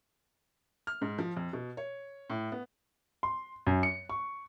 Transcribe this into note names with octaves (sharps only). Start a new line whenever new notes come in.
F6
G#2
F3
F2
B2
C#5
A2
B3
C6
F#2
C#7
C#6